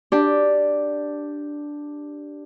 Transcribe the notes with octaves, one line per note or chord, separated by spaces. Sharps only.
D4 G4